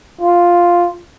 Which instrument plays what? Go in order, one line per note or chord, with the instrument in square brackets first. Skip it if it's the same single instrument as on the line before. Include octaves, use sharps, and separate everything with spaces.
[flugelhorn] F4